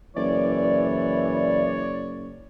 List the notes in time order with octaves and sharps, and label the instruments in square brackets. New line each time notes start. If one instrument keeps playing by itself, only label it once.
[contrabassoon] F#1 [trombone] E3 [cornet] C#5 [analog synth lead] D5